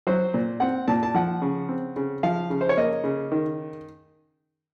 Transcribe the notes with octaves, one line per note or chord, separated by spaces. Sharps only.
F#3 C5
A#2
C4 F#5
A#2 A5
A5
F3 F#5
C#3
C4
C#3
F3 F5
C#3
C5
C#5
A#3 D#5
C#3
D#3